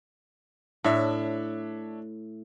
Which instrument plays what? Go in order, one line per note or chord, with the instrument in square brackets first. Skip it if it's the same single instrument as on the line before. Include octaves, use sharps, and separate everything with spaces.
[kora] A2 [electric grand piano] D4 C#5 E5